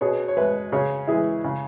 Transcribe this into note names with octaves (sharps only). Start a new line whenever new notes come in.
B2 G#4 C#5
C#5
G#3 B4 E5
C#3 G#4 C#5
E3 G#3 E4 G#4
C#3